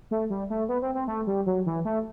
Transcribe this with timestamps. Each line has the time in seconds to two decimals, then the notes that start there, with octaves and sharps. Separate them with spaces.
0.11 A3
0.30 G3
0.50 A3
0.69 B3
0.82 C4
0.95 C4
1.08 A3
1.27 G3
1.46 F#3
1.66 E3
1.85 A3